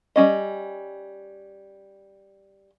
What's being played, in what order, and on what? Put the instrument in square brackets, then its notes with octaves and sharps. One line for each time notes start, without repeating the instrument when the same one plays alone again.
[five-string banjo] G3 C#4 D#5